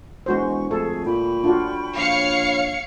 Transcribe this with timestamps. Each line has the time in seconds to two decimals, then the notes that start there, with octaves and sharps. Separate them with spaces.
0.26 E1 G#3 F#4 C5 C#6
0.71 F2 A3 G#4 A4 C#6
1.06 A#2 G5 B5 C#6
1.44 D4 F4 F#4
1.97 A#1 C#5 F5 C#7